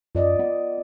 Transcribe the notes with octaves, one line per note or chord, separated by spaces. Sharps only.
F#2 F4 D5 D#5
B3